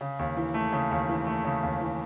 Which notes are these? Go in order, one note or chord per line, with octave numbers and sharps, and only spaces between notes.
C#3
D#2
E3
A3
C#3
D#2
E3
A3
C#3
D#2
E3